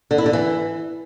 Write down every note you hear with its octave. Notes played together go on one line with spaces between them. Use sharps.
D3
E4
D3
E3